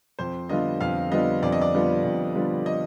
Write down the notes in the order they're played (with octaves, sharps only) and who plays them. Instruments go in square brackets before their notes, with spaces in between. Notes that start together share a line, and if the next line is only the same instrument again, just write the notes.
[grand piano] F2 [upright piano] C5
[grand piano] D3 G3 B3 F4 [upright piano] D#5
[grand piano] F2 [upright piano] F5
[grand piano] D3 G3 B3 F4 [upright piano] D#5
[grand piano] F2 [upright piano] D5
[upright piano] D#5
D5
[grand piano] D3 G3 B3 F4
F2
D3 G3 B3 F4
[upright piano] D#5